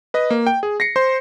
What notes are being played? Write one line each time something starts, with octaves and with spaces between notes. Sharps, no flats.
B4 D#5
A#3
G5
G#4
A#6 C7 C#7
C5 C6